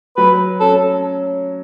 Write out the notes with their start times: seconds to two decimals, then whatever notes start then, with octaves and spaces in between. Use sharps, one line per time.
0.17 F#3 B4
0.60 C#4 A4